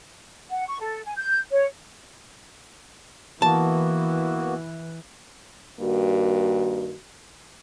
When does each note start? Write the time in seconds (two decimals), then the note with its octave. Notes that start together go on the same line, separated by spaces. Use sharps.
0.51 F#5
0.67 C#6
0.80 A4
1.05 G#5
1.17 G6
1.52 C#5
3.42 E3 A#3 B3 F#4 A5
5.80 G2 D#3 A#3 F#4